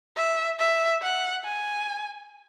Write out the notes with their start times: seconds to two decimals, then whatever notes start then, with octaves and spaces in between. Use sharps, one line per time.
0.17 E5
0.59 E5
1.02 F#5
1.44 G#5